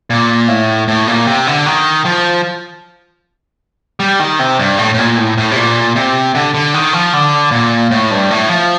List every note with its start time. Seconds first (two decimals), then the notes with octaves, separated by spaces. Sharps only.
0.10 A#2
0.48 A2
0.88 A2
1.07 A#2
1.27 C3
1.47 D3
1.66 D#3
2.05 F3
4.00 G3
4.20 D#3
4.39 C3
4.59 G2
4.78 A2
4.94 A2
4.98 A#2
5.17 A2
5.37 A2
5.51 C3
5.56 A#2
5.96 C3
6.35 D3
6.54 D3
6.74 D#3
6.93 F3
7.13 D3
7.51 A#2
7.91 A2
8.11 G2
8.31 A2
8.49 F3